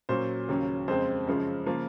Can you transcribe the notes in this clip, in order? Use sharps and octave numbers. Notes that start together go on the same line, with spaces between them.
A#2 F#3 C#4 C5
D#2 C#3 F#3 C#4
F2 C#3 G#3 C4 C5
F#2 C#3 F3 G#3
C#3 F3 A#3